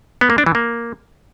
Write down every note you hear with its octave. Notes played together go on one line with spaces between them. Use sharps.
B3
A#3
D4
E3
A#3